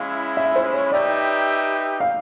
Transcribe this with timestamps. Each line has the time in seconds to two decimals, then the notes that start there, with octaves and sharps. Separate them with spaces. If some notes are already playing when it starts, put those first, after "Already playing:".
Already playing: G#3 C#4 E4 F5
0.37 E5
0.56 C5
0.73 C#5
0.92 D#4 G4 B4 D5 E5 G5
2.00 F5